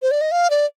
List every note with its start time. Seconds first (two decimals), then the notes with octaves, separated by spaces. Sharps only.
0.02 C5
0.11 D5
0.21 D#5
0.32 F5
0.50 D5